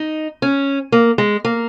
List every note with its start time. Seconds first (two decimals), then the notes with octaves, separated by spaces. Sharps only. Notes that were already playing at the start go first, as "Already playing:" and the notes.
Already playing: D#4
0.42 C#4
0.92 A#3
1.18 G#3
1.45 A#3